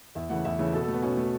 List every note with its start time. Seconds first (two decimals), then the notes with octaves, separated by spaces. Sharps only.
0.15 E2 E5
0.30 C#3 E3 A3 F#5
0.45 E2 E5
0.59 C#3 E3 A3
0.73 B2 A4
0.83 A4
0.88 A3
0.94 B3
1.02 B2 C#4
1.17 A3